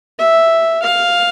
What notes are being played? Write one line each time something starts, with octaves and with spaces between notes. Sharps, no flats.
E5
F5